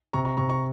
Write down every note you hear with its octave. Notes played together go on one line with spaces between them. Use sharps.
C3 A#5 C#6
A#5 C#6
C3 A#5 C#6
A#5 C#6